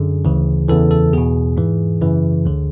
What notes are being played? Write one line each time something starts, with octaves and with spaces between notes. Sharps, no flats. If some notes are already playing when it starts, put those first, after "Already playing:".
Already playing: F#2 D3 G#4
D2 C#3 E3
E2 C#3 E3 A4
A4
E2 B2 G#4
G#2 E3
F#2 C#3 E3
D2 D3